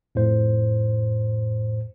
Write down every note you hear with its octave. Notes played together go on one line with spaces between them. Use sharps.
F2 A2 C5